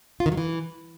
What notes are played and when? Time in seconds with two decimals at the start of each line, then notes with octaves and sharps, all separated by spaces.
0.20 F4
0.26 D#3
0.32 F#3
0.37 E3